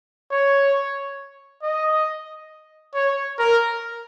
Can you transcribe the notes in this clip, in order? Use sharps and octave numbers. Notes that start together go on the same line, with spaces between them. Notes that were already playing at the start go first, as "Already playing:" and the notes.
C#5
D#5
C#5
A#4